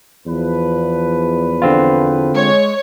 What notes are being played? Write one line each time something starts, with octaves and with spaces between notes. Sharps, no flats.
E2 F3 B4
D3 C4 F4
G#3 C#5